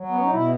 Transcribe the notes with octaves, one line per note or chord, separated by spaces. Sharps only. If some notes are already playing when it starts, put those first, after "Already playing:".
Already playing: F#3
B3
C#4
D#4
B2 E4